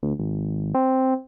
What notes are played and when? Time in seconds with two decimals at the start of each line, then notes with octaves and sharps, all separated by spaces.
0.03 D2
0.19 G#1
0.75 C4